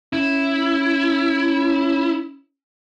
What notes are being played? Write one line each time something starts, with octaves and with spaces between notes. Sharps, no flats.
C#4 E4